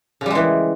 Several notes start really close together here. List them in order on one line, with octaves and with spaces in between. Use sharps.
C#3 G3 G#3 E3